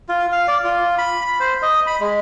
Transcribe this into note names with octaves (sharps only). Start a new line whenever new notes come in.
F4
F5
D5
F4
B5
B5
C5
D#5
B5
G#3